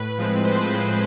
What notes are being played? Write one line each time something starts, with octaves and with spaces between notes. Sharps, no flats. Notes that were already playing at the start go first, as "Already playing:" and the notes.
Already playing: A2 B4
F3 G#3 C4
A2 C5
B4
C5
F3 G#3 C4